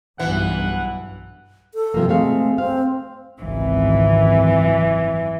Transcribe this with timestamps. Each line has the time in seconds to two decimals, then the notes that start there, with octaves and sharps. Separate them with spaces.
0.20 B1 G2 E3 F#5
1.74 A4
1.94 C3 F3 A#3
2.09 G#3 A3 C4 F5
2.58 C4 F5
3.41 G#1 C#2 F#2 E3